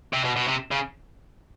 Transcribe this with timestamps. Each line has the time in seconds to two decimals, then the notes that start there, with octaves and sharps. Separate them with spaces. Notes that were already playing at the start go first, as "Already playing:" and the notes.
0.13 C3
0.24 B2
0.36 B2
0.48 C3
0.71 C#3